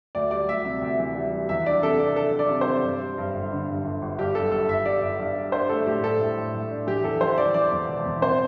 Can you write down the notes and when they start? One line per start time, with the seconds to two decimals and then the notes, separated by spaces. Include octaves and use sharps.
0.15 D2 D5
0.31 G3 D5
0.48 D2 E5
0.65 C3
0.82 D2
0.99 E3
1.15 G3
1.32 G3
1.49 E2 E5
1.66 D4 D5
1.82 C3 A4
1.99 C3 D5
2.16 D4 A4
2.33 D4
2.39 D5
2.50 C3
2.61 C5
2.67 C3
2.83 G2
3.00 G3
3.18 G2
3.34 G1
3.52 D3
3.68 G2
3.85 G1
4.02 G1
4.19 G2 G4
4.35 G2 A4
4.52 G1 A4
4.68 G1 E5
4.86 G3 D5
5.02 G1
5.19 G2
5.36 G3
5.52 D4 C5
5.69 A3 A4
5.86 A2 G4
6.03 D4 A4
6.20 A2
6.37 A2
6.54 A2
6.71 D4
6.87 E3 G4
7.04 E2 A4
7.21 E3 C5
7.38 E3 D5
7.54 E3 D5
7.71 E2
7.88 E1
8.05 E2
8.21 C4 C5